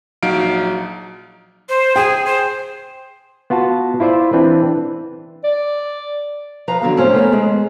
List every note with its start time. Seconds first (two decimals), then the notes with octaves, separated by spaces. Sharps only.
0.23 A#1 F#3 D#4 F5 D7
1.69 C5
1.96 G#4 G5
2.26 C5
3.50 B3 F4 F#4 A5
4.00 E4 F4 C5 D5 E5
4.33 E3 C4 D4 B4
5.44 D5
6.68 F3 B4 F5 A#5
6.81 D3 F#3 B3 F5
6.96 F2 A2 C#4 C5
7.14 A3 B3 B4 A#5
7.32 G#3 G#4